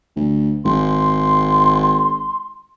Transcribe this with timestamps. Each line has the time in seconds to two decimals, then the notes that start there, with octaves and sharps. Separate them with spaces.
0.16 D2
0.65 G#1 C6